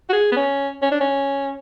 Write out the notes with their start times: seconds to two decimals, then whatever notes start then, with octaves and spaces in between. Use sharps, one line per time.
0.09 F#4
0.13 G#4
0.32 B3
0.36 C#4
0.82 C#4
0.91 D4
1.01 C#4